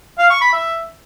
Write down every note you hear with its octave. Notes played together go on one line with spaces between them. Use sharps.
F5
C#6
B5
E5